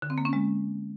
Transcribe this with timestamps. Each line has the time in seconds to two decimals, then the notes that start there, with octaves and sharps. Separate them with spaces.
0.02 D3
0.10 C4
0.18 A#3
0.25 C#4
0.33 G#3